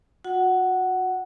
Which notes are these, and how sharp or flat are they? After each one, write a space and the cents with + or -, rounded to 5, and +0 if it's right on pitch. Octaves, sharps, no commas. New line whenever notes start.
F#4 -30 F#5 +10